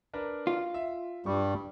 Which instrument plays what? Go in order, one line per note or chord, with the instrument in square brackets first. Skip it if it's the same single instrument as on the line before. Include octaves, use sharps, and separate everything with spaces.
[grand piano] D4 A#4 B4
[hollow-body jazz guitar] F4
[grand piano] E5
[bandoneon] G2 G3 [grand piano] C#6